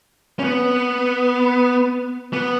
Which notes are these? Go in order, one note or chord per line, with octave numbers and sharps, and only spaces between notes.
C#4
B3
B3